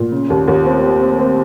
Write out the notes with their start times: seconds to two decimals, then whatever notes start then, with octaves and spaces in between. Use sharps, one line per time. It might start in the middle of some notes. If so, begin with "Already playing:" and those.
Already playing: A#2
0.12 C#3
0.30 D#2
0.48 D#2
0.65 C4
0.84 C4
1.01 C4
1.19 C4